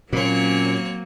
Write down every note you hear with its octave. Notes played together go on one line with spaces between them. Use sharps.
A#2 F#3 A#3 C4 C#4 C#5